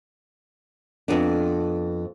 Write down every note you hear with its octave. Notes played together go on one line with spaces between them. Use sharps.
F2 B3 D4